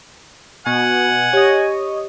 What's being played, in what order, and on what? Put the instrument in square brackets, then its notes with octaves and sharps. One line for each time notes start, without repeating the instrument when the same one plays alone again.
[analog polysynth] B2 [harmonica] F#5 [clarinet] G#5
[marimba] G4 [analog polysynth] C#5 D#5